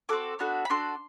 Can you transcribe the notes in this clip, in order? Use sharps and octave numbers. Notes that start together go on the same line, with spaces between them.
C4 F#4 A4 D6
B3 D4 F#4 A4
B5
D4 F#4 A4 C6